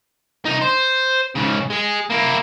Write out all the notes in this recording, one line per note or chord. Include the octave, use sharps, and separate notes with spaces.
C2 D#4
C5
G#2 C#3
G#3 G#4
A#3 E4